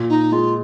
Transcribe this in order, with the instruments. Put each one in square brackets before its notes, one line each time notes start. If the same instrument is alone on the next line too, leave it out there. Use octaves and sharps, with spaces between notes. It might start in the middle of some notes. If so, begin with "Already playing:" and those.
Already playing: [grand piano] A#2
[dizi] D#4
[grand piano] G#3 [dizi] F4